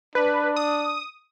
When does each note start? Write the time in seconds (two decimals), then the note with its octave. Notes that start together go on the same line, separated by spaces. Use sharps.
0.15 D4 B4
0.56 D#6